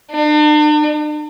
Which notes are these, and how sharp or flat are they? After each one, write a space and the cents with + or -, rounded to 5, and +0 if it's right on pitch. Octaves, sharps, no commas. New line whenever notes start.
D4 +45